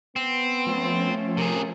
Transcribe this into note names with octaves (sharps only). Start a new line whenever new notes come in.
B3 C4
F3 A3 C#4
C3 G#4 A#4